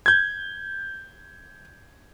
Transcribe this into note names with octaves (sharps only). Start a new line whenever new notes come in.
G6 G#6